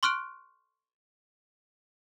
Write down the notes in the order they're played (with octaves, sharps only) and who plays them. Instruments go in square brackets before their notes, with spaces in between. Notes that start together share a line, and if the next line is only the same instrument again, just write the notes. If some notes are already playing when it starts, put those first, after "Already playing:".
[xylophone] C6 C#6 F6 F#6 D7